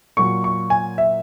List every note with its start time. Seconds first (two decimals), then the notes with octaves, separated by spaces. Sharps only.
0.17 A#2 F#3 C#6
0.44 C#6
0.70 G#5
0.98 E5